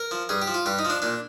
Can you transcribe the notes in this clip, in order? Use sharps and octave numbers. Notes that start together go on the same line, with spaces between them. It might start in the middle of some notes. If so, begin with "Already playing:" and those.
Already playing: A#4
F3
G2 G#4
G4
F3
F4
G2 G4
D#4
F3
D4
A#2 D4